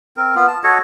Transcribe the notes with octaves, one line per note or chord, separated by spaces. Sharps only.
C4 A#4
B3 F4
A5
F#4 A4 C#5 D#5